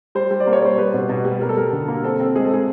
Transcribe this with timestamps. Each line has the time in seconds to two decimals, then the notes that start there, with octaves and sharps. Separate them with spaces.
0.15 G3 C5
0.31 G3
0.40 D5
0.47 A#3
0.53 C#5
0.62 G3 C5
0.78 G3 B4
0.94 B2
1.09 B2
1.25 G3
1.41 G3 A#4
1.49 A4
1.57 G3 A#4
1.73 D3
1.88 A#3
2.04 C4 A4
2.20 C4 A4
2.36 G#3 G#4
2.45 A4
2.51 D#4 G#4